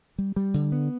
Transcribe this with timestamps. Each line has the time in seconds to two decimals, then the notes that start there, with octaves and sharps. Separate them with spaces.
0.18 G3
0.36 G3
0.54 D3
0.72 B3